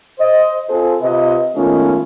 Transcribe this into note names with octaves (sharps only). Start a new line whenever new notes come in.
C5 D#5
C4 F4 G#4 A4 C5
C3 F4 B4 D#5
D#3 G#3 A3 B3 C#4 F4